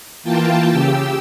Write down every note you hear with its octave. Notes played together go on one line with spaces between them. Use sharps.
E3 A#3 F4 G5 A5
C#3 G4 E6